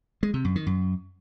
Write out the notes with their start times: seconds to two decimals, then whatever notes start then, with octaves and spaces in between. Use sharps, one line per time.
0.23 G#3
0.34 C3
0.45 F#2
0.56 D#3
0.67 F#2